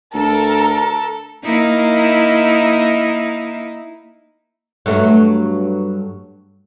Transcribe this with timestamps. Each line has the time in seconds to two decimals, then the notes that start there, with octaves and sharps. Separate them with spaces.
0.14 D2 A4 A#4
1.43 A#3 D#4 E4
4.86 G2 F#3 A3